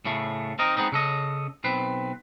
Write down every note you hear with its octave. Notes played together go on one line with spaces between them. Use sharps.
A2 C#3 A3
C4 D#4 A#4 D#5
G#3 B3 C4 D#4
C#3 A4 D#5
B1 C4 B4